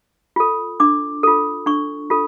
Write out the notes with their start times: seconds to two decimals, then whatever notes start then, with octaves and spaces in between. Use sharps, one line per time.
0.36 F4 A4
0.80 D4 D6
1.23 F4 A4
1.66 D4 C#6
2.10 F4 A4